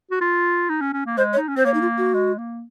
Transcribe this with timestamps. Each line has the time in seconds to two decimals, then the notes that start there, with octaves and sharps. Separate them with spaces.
0.11 F#4
0.21 F4
0.69 D#4
0.81 C#4
0.93 C#4
1.06 A#3
1.18 G#3 C5
1.33 C#5
1.37 D#4
1.48 C#4
1.56 C4 C5
1.65 A#3 C#5
1.74 D#4
1.82 F4
1.98 F#4
2.14 G#3
2.38 A#3